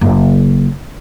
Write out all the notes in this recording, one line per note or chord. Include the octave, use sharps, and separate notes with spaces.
F#1